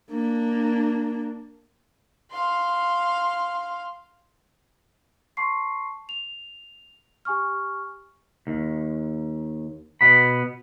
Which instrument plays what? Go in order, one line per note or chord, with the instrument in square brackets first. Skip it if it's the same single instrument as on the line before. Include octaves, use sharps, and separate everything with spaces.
[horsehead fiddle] A#3 D4
[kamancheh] F5 C6
[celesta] A5 C6 C#6 C7
F7
G4 G#5 C#6 F6
[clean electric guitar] D#2
B2 B3 B5